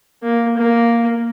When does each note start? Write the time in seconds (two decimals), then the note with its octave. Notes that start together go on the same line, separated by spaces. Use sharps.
0.23 A#3
0.57 A#3